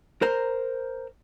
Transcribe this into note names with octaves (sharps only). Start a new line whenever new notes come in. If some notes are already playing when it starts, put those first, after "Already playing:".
A#4 C5 A#5